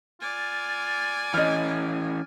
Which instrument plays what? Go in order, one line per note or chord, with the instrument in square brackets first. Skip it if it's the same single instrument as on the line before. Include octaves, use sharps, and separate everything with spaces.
[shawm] F4 [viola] D5 G#5
[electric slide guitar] E3 C#4 [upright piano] D#5 F6